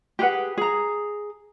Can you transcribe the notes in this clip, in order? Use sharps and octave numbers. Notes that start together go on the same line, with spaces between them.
G4 G#4 B4 F#5
G#4 A#5